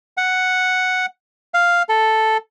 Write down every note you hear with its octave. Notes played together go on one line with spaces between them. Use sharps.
F#5
F5
A4